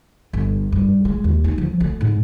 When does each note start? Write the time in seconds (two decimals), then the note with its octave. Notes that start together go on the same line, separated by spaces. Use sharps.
0.33 G1
0.72 G2
1.05 G#3
1.24 D#2
1.44 D#4
1.58 F3
1.80 D2
2.01 G#2